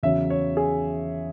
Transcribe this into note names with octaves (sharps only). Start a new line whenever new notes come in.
E2 C#3 F#3 E5
C#5
G#4